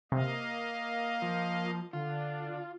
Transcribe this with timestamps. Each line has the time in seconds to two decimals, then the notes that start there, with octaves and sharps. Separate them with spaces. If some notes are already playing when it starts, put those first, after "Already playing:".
0.12 C3 A#3 D#5 F5
1.22 F3
1.93 D3 D4 F4